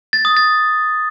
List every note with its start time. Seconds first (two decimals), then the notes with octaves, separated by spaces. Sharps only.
0.13 A6
0.25 D#6
0.37 A6